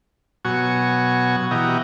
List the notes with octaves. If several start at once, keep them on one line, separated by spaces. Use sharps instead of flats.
B2 F#3 F#4 G#5 C#6
B2 E3 F#4 G4 D#5 A#5